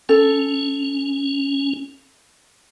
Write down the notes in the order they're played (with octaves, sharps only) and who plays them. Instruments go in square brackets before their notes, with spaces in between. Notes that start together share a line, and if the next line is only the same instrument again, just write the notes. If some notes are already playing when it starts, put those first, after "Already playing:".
[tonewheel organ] C#4 [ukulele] A4